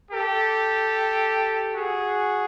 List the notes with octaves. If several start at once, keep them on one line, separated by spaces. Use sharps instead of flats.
G4 A4
F#4 G#4